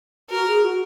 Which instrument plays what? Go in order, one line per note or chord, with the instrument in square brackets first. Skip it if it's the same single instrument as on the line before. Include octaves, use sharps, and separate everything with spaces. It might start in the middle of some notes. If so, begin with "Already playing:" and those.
[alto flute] F#4 [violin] A#4
[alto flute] G#4
F#4